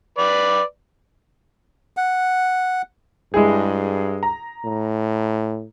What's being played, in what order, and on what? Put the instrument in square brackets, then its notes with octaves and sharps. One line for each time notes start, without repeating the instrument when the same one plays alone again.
[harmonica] B4 D5
[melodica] F#5
[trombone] G2 [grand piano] G#3 E4 G#4
[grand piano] A#5
[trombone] A2